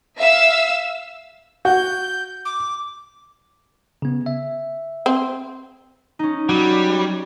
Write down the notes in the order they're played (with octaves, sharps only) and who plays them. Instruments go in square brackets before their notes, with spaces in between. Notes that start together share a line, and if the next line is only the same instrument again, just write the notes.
[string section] E5 F5 E6
[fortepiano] F#4 [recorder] G6
[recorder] D6
[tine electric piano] C#3 B3
E5
[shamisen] C4
[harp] C#4 D#4
[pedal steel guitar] F#3 [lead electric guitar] G3